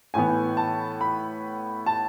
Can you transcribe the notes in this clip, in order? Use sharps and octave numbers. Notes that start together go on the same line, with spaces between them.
A2 E3 B3 G#5
A5
B5
A5